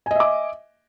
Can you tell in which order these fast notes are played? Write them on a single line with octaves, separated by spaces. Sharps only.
G#5 D#5 E5 D6